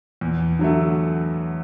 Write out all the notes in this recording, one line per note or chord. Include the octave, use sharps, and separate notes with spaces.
E2
D3 F#3 A3